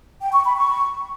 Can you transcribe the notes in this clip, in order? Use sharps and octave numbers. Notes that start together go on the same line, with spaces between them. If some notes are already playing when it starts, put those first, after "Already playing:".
G5
C#6
B5
C#6